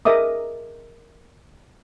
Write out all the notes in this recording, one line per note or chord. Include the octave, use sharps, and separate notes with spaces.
G#4 A#4 D#5 E5 D6 D#6